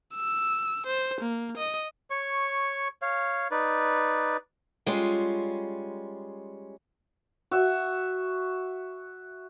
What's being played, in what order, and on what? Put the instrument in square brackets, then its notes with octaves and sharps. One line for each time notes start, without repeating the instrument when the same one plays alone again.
[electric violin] E6
C5
A#3
D#5
[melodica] C#5 C#6
C#5 F5
D#4 B4 D5
[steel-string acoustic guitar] G3 G#3 C#4 F4
[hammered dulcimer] F#4 E5